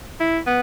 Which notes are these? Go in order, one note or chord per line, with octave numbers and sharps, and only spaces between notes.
E4
B3